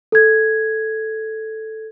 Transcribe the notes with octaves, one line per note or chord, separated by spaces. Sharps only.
A4 G#6